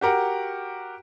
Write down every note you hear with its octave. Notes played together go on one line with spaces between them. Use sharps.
F#4 G4 A#4 F#5